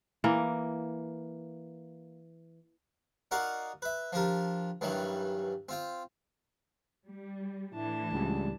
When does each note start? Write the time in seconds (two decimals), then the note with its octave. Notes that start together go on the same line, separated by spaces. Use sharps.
0.24 E3 A#3
3.31 D#4 F#4 A#4 D5 D#5 F5
3.82 B4 E5
4.13 F3 D4 G4 A#4
4.81 G2 D#3 E3 F#3 G3
5.69 C4 F4 G5
7.07 G3
7.74 A2 E3 D4 E4 A5
8.12 C#2 G3